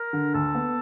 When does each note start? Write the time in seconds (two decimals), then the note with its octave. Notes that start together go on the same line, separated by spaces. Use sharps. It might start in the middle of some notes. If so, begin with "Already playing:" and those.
Already playing: A#4
0.13 D3
0.34 D2 A4
0.55 B3